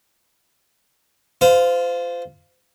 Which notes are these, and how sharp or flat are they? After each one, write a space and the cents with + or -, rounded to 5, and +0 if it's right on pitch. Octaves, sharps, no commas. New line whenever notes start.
F4 +0 C5 -30